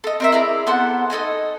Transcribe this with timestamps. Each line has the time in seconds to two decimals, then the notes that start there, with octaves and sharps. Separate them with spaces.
0.04 A4 D#5
0.20 C4 A#4 E5
0.32 E4 G#4 D5 A#5
0.67 B3 A4 C5 F#5
1.10 D#4 A4 D#5 G#5